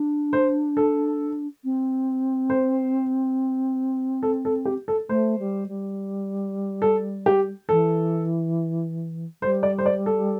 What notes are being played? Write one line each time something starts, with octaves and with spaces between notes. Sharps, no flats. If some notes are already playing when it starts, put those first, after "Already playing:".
Already playing: D4
C5
A4
C4
C5
A4
A4
G4
A4
A3 C5
G3
G3
A4
G4
E3 A4
G3 C5
D5
C5
D5
A4